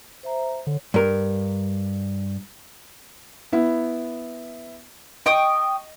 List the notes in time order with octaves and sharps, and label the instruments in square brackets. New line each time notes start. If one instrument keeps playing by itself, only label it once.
[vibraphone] C5 E5 A#5
[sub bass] D3 [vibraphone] C#5
[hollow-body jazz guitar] G2 A#4
[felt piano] B3 E4
[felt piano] D#5 [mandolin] G5 C#6 D#6